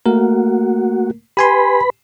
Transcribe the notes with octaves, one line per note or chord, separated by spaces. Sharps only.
A3 A#3 F#4 A#4
G4 B4 G#5 B5 C6